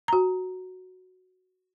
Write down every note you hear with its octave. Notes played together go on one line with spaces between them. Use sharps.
F#4 A#5